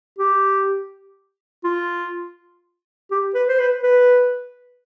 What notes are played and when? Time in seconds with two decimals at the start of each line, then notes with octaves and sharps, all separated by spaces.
0.19 G4
1.64 F4
3.11 G4
3.35 B4
3.49 C5
3.60 B4
3.83 B4